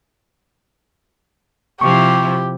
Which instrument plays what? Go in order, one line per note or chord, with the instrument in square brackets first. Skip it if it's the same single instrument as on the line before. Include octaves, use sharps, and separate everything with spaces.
[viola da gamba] C3 F3 E4 [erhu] G4 [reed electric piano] C#6